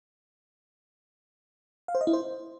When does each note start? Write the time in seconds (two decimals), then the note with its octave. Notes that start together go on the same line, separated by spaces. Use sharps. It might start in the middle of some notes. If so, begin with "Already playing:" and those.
1.88 F5
1.95 C5
2.01 D#5
2.07 E4
2.13 C5